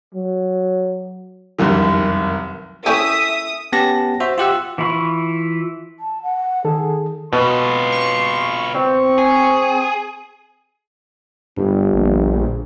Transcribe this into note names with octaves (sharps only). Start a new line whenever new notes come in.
F#3
F1 C2 F#2 D#3
C#4 E4 G4 A4 E5 G#5 D#6
B3 C#4 G4 A5 A#6
F#4 C5 E5
F4 G4 F#5 E6
E3 E4 F4 B5 C#6
A5
F#5
D#3 G#4 A4
B2 F4 B4 C6
C#6
C4 C#6
G#4
G1 G2
A#1